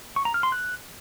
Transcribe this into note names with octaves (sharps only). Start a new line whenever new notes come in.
C#6
A#5
F6
C6
F#6